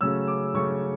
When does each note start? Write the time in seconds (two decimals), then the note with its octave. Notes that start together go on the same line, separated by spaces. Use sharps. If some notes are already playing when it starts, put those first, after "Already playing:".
0.01 C#3 F#3 A3 C#4 E6
0.28 D6
0.54 C#3 F#3 A3 C#4 C#6